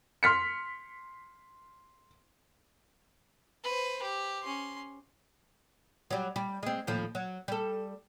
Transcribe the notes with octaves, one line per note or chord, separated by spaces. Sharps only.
C6 F6 B6 C#7
B4 C5
G4
C#4 C6
F#3 G3
G3
G#3 C4
D#2 A2 F3
F#3
G3 A4